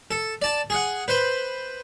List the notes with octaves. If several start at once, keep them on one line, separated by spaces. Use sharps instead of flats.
A4
D5 A5
G#4 F#5
B4 C5